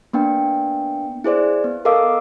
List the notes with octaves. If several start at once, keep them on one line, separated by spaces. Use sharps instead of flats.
A#3 B3 D4 G5
E4 G#4 C5 D5
B3
A4 A#4 D#5 F5 D6 E6